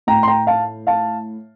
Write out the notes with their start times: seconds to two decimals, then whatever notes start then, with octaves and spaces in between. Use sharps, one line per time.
0.07 A2 G5 A#5
0.23 C6
0.28 G5 A#5
0.47 F5 A5
0.87 F5 A5